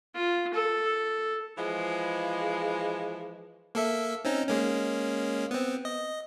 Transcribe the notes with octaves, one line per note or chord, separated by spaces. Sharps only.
F4
A4
E3 F3 G#3
A#3 A4 E5
C4 C#4 D#4
G#3 A#3 C#4
B3 C4
D#5